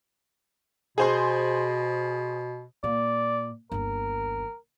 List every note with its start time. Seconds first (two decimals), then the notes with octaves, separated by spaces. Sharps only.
0.98 B2 G#4 C5 C6
2.84 A#2 D5
3.72 G1 D#2 A#4